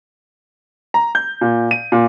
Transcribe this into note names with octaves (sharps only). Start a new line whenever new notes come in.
A#5
G6
A#2
D#7
A#2